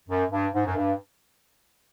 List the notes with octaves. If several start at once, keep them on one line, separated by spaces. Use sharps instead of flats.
F#2
G2
G#2
F#2
G2